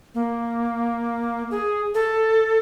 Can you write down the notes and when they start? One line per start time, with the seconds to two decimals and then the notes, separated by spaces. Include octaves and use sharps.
0.15 A#3
1.51 G#4
1.94 A4